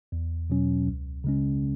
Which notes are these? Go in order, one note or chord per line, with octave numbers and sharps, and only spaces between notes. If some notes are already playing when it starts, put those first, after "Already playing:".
E2
B2 F#3 C#4
C#2
C#3 G#3 C#4